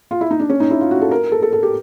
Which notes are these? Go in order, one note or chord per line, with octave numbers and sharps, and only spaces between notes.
F4
E4
D#4
D4
C#4
D#4
E4
F4
F#4
A4
A#4
A4
A4
A4
G4